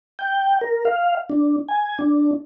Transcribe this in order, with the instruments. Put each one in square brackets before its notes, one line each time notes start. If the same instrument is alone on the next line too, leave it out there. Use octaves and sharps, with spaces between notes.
[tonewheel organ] G5
A#4
F5
D4
G#5
D4